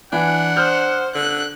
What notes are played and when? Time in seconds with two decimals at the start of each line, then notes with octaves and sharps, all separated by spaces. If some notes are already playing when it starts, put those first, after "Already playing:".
0.13 E3 D4 F#5
0.56 C5 D#6 F6 G6
1.15 D3 F#6